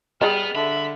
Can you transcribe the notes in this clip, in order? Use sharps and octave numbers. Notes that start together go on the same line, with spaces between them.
G3 B3 G#4 D5 D#5 F6
D3 E5 B5